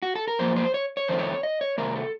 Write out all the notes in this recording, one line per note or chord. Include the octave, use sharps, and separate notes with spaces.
F#4
A4
A#4
F#2 F3 A#3 C5
C5
C#5
C#5
F2 D#3 A3 C4 C5
C#5
D#5
C#5
C3 D#3 A3 A#4
A4